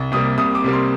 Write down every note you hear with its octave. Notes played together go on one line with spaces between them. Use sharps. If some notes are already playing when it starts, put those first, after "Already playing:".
Already playing: C2
C3 G3 A#3 D#6
C2 D#6
D6
C3 G3 A#3
C6